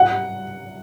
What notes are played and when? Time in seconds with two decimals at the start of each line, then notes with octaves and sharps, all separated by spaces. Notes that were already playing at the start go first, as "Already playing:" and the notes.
Already playing: F#5